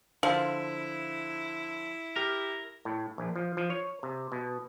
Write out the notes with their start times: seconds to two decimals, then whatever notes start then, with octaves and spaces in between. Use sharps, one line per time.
0.23 D3 F3 E4
2.16 G4 A#4 B6
2.85 A2
3.18 A#1
3.36 F3
3.57 F3
3.70 C#5
4.03 C3
4.32 B2